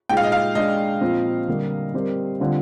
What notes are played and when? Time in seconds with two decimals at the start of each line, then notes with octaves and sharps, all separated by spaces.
0.09 A#2 G#3 D#4 G#4 G5
0.17 F5
0.23 D#5
0.32 F5
0.55 G#3 D4 G#4 D#5
1.01 A#2 F3 C4 F4
1.47 D3 G3 A#3
1.94 G3 C4 G4 A#4
2.40 D3 G3 C4 F4